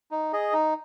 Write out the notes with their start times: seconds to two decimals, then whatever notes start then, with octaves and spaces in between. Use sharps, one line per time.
0.11 D#4
0.33 G#4 D#5
0.53 D#4